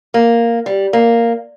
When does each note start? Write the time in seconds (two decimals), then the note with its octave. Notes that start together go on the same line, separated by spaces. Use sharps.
0.14 A#3
0.66 G3
0.93 A#3